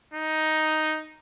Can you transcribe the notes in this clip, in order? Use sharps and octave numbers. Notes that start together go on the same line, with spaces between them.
D#4